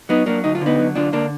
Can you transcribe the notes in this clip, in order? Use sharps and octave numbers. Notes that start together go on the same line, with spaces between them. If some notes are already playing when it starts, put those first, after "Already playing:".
F#3 B3 D#4
F#3 A#3 D4
D2 D#4
F4
D3 B3 D#4
F#3
D3 D4 F4
D3 A#3 D4